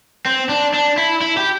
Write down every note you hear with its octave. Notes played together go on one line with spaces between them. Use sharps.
C4
D4
D4
E4
E4
G4